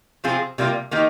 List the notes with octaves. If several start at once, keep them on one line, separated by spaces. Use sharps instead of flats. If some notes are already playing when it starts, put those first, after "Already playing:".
C3 F3 C4 F4 G#4
C3 G3 A#3 F4
D#3 A#3 D#4 G4